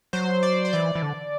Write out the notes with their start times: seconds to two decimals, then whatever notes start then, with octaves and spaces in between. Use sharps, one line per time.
0.13 F#3 C5
0.43 D5
0.65 C5
0.73 E3 D5
0.95 E3
1.02 D3